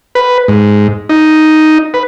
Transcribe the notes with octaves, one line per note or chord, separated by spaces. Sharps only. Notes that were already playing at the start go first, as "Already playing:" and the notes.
B4
G#2
D#4
B4